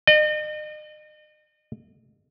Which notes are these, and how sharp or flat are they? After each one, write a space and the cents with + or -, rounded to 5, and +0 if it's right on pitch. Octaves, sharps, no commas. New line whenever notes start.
D#5 -40